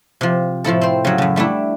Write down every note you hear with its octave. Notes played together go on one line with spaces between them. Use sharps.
C3 F3
A2 F3 E4 A4
C4 C5
C#3 F#3
F#2 C#3
G3 A3 D4 E4